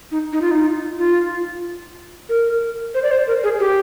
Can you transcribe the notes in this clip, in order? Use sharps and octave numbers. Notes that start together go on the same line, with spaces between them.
D#4
D#4
F4
D#4
F4
A#4
C5
D5
C5
A#4
G#4
G4